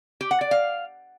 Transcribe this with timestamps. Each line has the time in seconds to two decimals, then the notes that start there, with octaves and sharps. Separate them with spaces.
0.21 G4
0.31 F#5
0.41 D5
0.51 F5